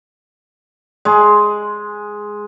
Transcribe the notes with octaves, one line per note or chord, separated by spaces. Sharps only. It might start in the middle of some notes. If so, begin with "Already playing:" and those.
G#3